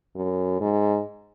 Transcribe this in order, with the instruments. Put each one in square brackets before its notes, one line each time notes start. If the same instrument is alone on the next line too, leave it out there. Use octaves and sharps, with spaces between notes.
[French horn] F#2
G#2